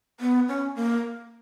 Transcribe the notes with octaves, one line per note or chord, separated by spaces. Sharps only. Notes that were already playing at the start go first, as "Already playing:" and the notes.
B3
C#4
A#3